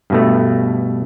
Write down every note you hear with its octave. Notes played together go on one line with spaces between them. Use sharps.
G2 B2 A3